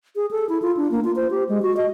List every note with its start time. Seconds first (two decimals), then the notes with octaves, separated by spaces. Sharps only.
0.16 G#4
0.31 A4
0.49 E4
0.62 F4
0.77 D4
0.91 A#3
1.04 F4
1.16 C5
1.31 G4
1.49 G#3
1.62 F#4
1.77 D#5